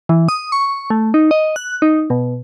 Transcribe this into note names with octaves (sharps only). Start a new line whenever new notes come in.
E3
D#6
C#6
A3
D#4
D#5
F#6
D#4
B2